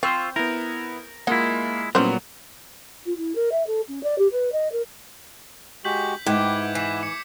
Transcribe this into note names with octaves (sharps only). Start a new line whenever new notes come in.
C4 F4 C5 C#6 E6 G6
B3 E4 A#4
G#3 A#3 E4 F4 D#5 F#5
A#2 F#3 G3 B3 C#4 E4 C5
F4
E4
A#4
E5
A4
C#4
D5
G4
B4
D#5
A#4
G#3 F#4 G4 G6 B6 F#7
G#2 E4 G4 B4 F#5 D6 G#6
E3 B6 E7
C#7